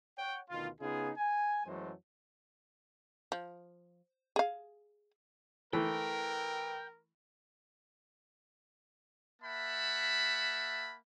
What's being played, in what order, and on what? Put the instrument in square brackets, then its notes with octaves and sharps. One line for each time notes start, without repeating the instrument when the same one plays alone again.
[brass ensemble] C#5 F#5 G5
D2 B2 D#3 F4
C#3 B3 D#4 F4 G#4
G#5
F#2 E3 F#3 G#3 A3 C5
[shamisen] F3
G#4 F5
[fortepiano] E3 A3 [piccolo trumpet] A#4 [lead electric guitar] G5
[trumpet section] A#3 E5 F#5 A5 B5